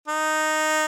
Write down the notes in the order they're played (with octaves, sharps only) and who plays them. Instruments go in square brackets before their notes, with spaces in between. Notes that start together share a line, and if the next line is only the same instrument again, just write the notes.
[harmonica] D#4